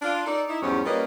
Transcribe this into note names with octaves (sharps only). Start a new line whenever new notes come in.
D4 F4
D#4 A4 D5
D#4 E4
E2 G#2 F#3 G3 C4 C#4
G3 A#3 C#4 F4 B4 D#5